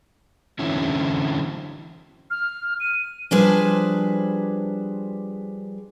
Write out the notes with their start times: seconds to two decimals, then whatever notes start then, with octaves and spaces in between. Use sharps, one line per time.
0.59 D3 E3 F#3 C4 C#4 E4
2.30 F6
2.80 D#7
3.31 F3 G3 D4 G#4 B4 C5